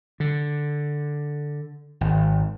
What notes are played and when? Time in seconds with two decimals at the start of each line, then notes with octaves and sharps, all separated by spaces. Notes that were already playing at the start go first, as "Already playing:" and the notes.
0.20 D3
2.01 G#1